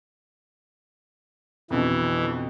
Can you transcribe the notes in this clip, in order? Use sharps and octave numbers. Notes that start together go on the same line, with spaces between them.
F2 B2 D3 E3